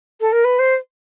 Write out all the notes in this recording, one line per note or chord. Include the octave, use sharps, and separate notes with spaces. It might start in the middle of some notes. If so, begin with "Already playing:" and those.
A4
A#4
B4
C5